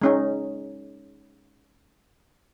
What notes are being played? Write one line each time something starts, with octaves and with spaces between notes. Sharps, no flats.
G#3 C#4 D#4